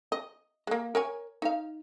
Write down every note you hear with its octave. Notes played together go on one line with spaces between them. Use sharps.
D#5
G#3 A#3
A#4 C#5 G#5
D#4 F5